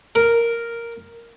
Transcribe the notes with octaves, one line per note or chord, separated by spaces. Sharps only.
A#4